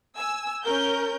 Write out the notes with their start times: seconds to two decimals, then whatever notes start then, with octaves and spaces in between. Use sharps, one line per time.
0.16 G#5 E6
0.63 C#4 A#4 G6